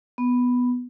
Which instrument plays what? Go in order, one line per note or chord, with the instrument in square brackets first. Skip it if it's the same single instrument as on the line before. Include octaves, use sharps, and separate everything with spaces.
[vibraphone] B3